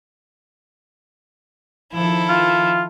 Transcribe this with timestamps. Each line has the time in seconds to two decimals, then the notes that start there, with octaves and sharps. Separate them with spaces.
1.93 D#3 F3 E4 A4
2.29 F4